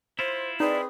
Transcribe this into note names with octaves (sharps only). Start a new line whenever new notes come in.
E4 F4 C5
C4 D#4 G#4 B4 D5